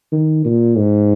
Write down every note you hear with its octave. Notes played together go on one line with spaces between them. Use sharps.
D#3
A#2
G#2